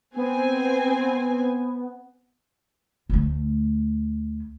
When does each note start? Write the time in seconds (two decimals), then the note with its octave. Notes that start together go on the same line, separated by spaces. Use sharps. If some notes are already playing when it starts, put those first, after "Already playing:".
0.16 B3 C4 G#5
3.10 D2 A3